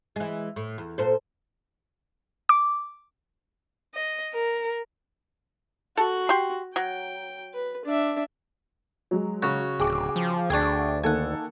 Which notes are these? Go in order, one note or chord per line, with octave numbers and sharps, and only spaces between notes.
E3 G#3
A2
E2
A#2 A4 C5
D6
D#5
A#4
F#4 A4
G4 C6
F#3 G5
B4
D4 E5
F#3 G#3
C#3 F#4
D1 G#4 G5 D6
F3
D2 D4 G#4 G5 C#6
D#3 A#3 A4 F#5 G#5